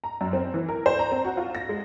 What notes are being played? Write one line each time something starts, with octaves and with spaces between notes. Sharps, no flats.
A#5
F#2
C4
E3
A#4
C5
A#5
C4
F#4
F4
A#6
G#3